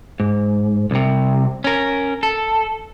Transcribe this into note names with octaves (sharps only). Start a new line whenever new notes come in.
G#2
C2 C3
C#4 A#4
A4